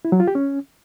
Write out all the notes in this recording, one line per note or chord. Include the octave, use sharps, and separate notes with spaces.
E4
F#3
F4
G4
C#4